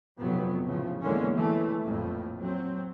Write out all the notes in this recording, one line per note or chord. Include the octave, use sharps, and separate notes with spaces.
F1 F2 C3 F#3 B3
A2 C#3 F3
E2 D3 E3 G#3 A#3 C#4
E3 A3
A#1 F2 A2
F#3 C4